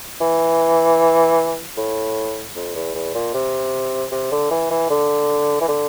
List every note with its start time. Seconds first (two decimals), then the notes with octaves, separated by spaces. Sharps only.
0.20 E3
1.77 A2
2.55 F2
2.75 E2
2.95 E2
3.14 A#2
3.34 C3
4.12 C3
4.31 D3
4.51 E3
4.70 E3
4.90 D3
5.61 E3
5.68 D3